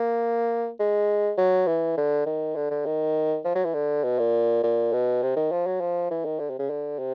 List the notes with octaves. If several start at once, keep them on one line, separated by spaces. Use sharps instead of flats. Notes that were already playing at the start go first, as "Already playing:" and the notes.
Already playing: A#3
G#3
F#3
E3
D3
D#3
D3
D3
D#3
F3
F#3
E3
D3
B2
A#2
A#2
B2
C3
D#3
F3
F#3
F3
E3
D#3
D3
C3
C#3
D3
C3